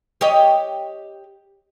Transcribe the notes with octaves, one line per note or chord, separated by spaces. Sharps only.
G4 C#5 D#5